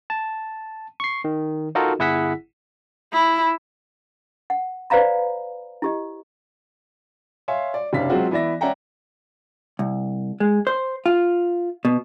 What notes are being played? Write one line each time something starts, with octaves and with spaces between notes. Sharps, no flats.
A5
C#6 C7
D#3
D#4 F4 F#4 A4 A#4 D#5
G1 E4 G#4 F#5 E6 B6
E4
F#5
B4 C5 D5 F5 A#5 B5
E4 G4 D#5
C#5 E5 F5 G#5 C6
D5
F#1 C3 C#4 D4 F5 B6
F#3 G#3 C4 F4 F#4
E3 B3 D5 E5 A#6
C#4 D5 E5 F#5 G5 A#5
C2
G#3
C5
F4
B2